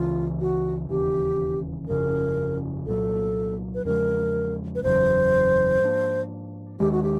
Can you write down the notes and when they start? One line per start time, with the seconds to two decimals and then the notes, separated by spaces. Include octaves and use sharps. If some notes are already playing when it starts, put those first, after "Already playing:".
Already playing: C#2 C#3 E3 F4
0.40 F#4
0.89 E1 D#2 C#3 E3 G4
1.88 G1 F2 C#3 A#4
2.86 C2 A#2 F#3 A4
3.75 B4
3.85 E2 C#3 F3 G#3 A#4
4.75 B4
4.83 F#1 E2 C#3 F#3 C5
5.81 G#2 F3 A#3 D4
6.80 D#2 D#3 G#3 G4
6.92 F#4
7.03 G4